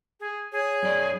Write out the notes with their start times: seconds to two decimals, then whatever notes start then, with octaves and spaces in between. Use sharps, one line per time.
0.20 G#4
0.52 G#4 C#5
0.83 F#2 D5